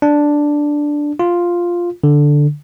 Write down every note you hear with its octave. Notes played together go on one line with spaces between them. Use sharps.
D4
F4
D3